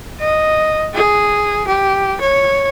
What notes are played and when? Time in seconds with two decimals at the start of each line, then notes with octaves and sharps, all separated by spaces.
0.20 D#5
0.94 G#4
1.68 G4
2.21 C#5